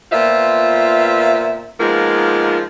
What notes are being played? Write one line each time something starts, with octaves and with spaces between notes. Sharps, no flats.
A#2 B3 F4 C5 E5
F3 G#3 A#3 B3 D#4 F4